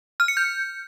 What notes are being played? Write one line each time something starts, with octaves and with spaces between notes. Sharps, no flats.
F6
C#7
G6